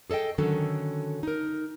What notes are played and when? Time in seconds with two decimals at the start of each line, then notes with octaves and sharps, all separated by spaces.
0.10 G#4 A4 D5 D#5 G5
0.38 D3 D#3 F#3 C#4 A4
1.23 D#4 A#4